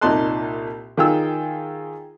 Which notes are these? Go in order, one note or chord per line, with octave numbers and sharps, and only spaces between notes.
C2 A#2 D#4 A5 C6 F#6
D#3 F4 G#4 G5 E6